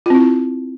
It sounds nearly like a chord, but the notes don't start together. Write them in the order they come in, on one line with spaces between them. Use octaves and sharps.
F4 C4 E4